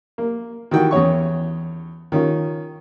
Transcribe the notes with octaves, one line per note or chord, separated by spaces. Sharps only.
A#3
D#3 E3 F#4 G5
E2 C#4 C#5 C#6
D#3 C#4 F4